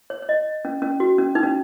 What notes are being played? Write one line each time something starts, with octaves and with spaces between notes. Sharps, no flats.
C#5
C#5
D#5
C#4
C#4
F#4
C#4
D#4
C#4